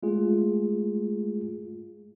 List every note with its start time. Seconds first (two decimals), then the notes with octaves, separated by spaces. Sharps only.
0.03 G#3 A3 F4 G#4